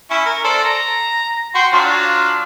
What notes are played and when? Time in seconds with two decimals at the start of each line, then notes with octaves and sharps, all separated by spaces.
0.11 C#4 E4
0.25 A#4
0.44 A4 C5 D5
0.64 A#5
1.55 F#4 G5 C6
1.73 F#3 D4 F4